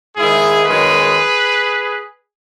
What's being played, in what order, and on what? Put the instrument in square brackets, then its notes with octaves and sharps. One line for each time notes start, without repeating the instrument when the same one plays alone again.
[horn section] G#2 D#3 G#3 E4 G#4
F#2 D#3 G#3 G#4 B4